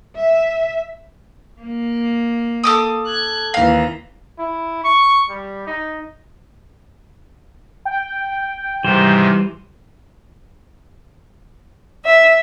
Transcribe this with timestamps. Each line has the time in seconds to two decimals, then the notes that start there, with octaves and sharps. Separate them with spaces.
0.16 E5
1.60 A#3
2.64 A4 D6 D#6
3.07 F#6 G#6
3.54 D#2 E3 F5 A#5
4.39 E4
4.84 C#6
5.29 G3
5.67 D#4
7.85 G5
8.84 G#2 C3 D#3 E3 G3 C5
12.04 E5